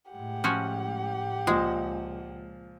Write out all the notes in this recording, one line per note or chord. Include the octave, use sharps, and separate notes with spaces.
A2 G#3 A3 G4 F#5
F3 C#4 F#4
C#2 A#2 F3 G#3